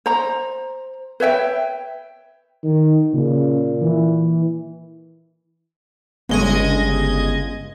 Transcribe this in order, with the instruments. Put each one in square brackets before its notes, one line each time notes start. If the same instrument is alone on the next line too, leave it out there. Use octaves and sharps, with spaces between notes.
[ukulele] C5 A#5
B4 C#5 E5 G5
[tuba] D#3
[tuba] A#2 [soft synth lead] C#3
[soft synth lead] E3
[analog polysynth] G1 D#5 G#6 [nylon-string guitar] C#3 G#3